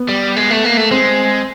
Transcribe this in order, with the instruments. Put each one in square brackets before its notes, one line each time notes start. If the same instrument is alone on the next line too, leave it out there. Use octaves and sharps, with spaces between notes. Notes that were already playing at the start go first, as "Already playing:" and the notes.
Already playing: [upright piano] B3
[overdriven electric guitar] G3
G#3
A3
A#3
A3
[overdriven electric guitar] G#3 [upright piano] C4